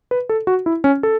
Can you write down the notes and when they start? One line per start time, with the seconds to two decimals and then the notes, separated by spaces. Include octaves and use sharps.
0.11 B4
0.29 A4
0.47 F#4
0.66 E4
0.84 C#4
1.03 A4